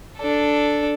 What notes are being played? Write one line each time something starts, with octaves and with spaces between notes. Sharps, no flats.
D4 A4